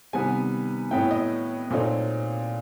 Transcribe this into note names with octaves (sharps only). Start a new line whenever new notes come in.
C3 D#3 G3 B3 G#5
A2 F#3 B3 E4 G5
D#5
A#2 F#3 A3 C4 D#4